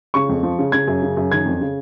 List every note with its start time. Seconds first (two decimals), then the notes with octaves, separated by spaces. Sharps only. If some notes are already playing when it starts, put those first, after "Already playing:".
0.14 C#3 C#6
0.29 F2
0.43 F3
0.59 C#3
0.72 C#3 G#6
0.87 F#2
1.02 C#3
1.17 F#2
1.32 D#3 G#6
1.46 F2
1.61 C#3